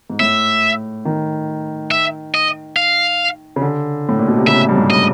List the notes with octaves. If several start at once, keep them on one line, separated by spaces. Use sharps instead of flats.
G#2
A2 E5
D#3
E5
D#5
F5
C#3
D3
A2
A#2
B2
C3
C#3 E5
G2
G#2
D#5